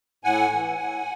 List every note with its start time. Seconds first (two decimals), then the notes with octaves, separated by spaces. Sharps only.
0.24 A2 F#5 G#5
0.53 E3
0.80 A2